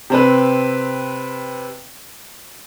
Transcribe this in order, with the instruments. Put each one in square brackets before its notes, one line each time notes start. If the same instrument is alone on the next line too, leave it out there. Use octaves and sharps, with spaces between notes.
[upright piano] C3 C4 B4